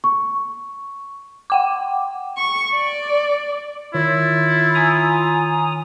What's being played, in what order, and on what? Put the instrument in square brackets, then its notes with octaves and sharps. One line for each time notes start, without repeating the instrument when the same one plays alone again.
[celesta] C#6
[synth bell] F#5 G5 D6
[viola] C#6
D5
[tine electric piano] D#3 C#5 [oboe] E4 [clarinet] F4
[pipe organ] G#5 A#5 D#6